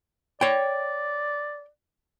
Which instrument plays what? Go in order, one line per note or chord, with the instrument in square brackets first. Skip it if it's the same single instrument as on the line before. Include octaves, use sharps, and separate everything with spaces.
[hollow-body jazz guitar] C#5 G5 [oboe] D5